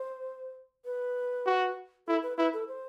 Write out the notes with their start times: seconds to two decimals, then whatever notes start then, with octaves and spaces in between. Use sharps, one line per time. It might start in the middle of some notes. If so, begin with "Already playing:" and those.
Already playing: C5
0.85 B4
1.46 F#4
2.08 E4 A4
2.23 B4
2.38 E4 B4
2.53 A4
2.68 C5